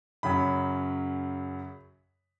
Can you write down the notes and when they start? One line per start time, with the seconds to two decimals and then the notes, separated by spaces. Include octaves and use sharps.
0.23 F#2 C#3 F#3 B5